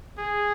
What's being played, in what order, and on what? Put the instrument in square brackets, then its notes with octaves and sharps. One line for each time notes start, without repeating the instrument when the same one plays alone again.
[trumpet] G#4